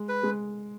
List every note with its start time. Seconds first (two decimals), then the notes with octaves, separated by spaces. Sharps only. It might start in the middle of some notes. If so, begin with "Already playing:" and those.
Already playing: G#3
0.09 B4
0.23 G#3